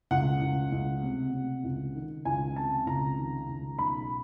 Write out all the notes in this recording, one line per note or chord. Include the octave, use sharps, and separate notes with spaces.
C#2 F#5
C#2
C#2
C3
C3
C#2
D#3
C#2 G#5
C3 A5
C#2 A#5
D#3
C#2
B1 B5